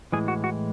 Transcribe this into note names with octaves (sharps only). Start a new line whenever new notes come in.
A2 E3 G#3 G#4
F#4
F#4